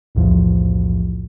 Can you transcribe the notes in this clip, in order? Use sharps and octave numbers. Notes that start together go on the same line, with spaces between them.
B1 E2 A2 F3